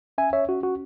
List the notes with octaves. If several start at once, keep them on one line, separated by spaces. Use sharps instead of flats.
C#4 E5 G#5
C#5 E5
C#4 F#4
F#4